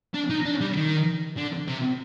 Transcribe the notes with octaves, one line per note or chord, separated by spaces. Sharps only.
D4
D#4
D4
G3
D#3
D3
C3